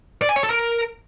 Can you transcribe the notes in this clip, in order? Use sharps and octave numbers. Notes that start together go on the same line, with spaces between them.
D5
G#5
C#5
A4
A#4